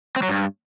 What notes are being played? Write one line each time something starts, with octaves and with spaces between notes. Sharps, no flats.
C4
F#3
G2